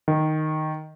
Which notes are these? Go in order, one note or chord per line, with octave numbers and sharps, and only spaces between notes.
D#3